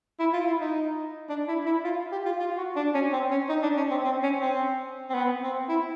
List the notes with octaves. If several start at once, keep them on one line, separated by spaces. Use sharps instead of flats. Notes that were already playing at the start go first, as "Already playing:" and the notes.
E4
F4
E4
D#4
D4
E4
E4
F4
G4
F4
F4
F#4
D4
C#4
C4
C#4
D#4
D4
C#4
C4
C4
C#4
C4
C4
B3
C4
E4